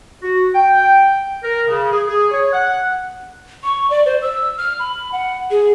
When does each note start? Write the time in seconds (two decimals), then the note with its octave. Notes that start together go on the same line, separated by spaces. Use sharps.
0.22 F#4
0.54 G5
1.43 A#4
1.68 C#3
1.91 G#4
2.08 G#4
2.31 C#5
2.52 F#5
3.63 C#6
3.90 D5
4.06 C5
4.22 E6
4.58 F6
4.79 B5
5.12 F#5
5.51 G#4